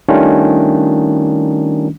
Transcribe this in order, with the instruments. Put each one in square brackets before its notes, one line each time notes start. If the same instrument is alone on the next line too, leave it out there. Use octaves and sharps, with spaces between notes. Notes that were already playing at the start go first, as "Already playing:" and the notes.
[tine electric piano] D#3 G3 A3 C#4 D4 F4